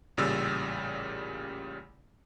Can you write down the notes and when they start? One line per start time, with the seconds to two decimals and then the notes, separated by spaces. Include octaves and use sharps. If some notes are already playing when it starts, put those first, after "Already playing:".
0.17 A1 A#2 C#3 G3 E6 A6